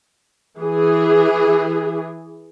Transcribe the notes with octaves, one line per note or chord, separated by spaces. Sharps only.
E3 G#4